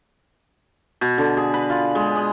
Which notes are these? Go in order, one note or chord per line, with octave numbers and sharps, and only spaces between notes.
B2
D3
G#4
B4
F4
G#3
D#5